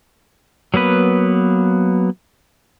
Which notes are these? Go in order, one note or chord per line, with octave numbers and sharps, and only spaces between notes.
F#3 A#3 B3 B4